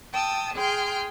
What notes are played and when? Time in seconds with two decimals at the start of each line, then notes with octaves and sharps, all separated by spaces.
0.13 G5 A5 D#6 E6
0.55 G#4 G5 C6 F6 G6